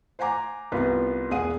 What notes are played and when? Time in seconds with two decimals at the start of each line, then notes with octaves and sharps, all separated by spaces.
0.19 C5 F#5 G#5 A#5 D6
0.72 C2 B3 F4 A#4 B4 C6
1.30 E1 A#2 G#4 F#5 D#7